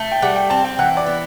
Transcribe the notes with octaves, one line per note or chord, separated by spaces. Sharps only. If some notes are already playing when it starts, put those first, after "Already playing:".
Already playing: A3
G5
G3 F#5
G5
C4 A5
G5
E3 F#5
D5
B3